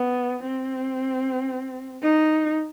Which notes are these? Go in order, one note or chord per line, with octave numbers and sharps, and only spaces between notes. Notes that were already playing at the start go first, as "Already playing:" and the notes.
Already playing: B3
C4
D#4